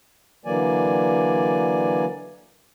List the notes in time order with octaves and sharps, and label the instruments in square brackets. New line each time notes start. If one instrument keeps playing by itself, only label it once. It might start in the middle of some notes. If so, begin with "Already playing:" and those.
[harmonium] D3 E3 F#3 A#3 D5 G#5